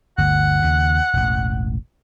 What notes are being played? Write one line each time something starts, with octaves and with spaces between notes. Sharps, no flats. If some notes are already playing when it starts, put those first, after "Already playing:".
G1 D2 F#5
D#2 C#3
E1 A1